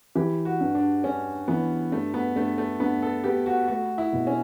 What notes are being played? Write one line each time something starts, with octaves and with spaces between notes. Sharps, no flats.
E3 G4
F#4
G2
D4
G2 C#4
E3 B3
G2 A3
B3
G2 A3
A3
G2 B3
A4
B3 G4
F#4
A3 F#4
E4
B2
C#4